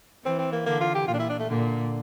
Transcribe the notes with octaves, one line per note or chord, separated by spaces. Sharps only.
E3 C4
C4
A#3
D3 A#3
F4
G4
A#2 F4
D4
E4
D4
A3
A#2 D3